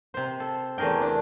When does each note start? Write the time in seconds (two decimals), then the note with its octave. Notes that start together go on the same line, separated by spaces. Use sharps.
0.14 C3 C5
0.40 A4
0.78 E2 A3 G#4 A#4 G5
1.01 D4